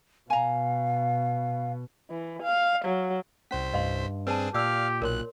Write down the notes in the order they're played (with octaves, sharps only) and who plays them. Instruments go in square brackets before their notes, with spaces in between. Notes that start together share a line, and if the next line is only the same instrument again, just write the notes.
[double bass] B2 [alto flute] F5 [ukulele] G#5 A#5
[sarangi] E3
F5
F#3
[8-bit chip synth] C2 C5 B6 [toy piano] C#4
[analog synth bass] G2 [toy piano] D#5 F5 C6
[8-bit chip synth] C4 D4 G#4 [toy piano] B4 A5
[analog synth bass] A#2 [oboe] G4 [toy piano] D5 E6 [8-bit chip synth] F5 F6
[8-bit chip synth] B1 F#6 [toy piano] A#4 C#5 C6